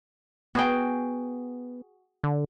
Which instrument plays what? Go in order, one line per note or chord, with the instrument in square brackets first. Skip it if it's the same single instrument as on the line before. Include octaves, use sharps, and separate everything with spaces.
[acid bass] B3 [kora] F#4 G#4 G5
[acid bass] D3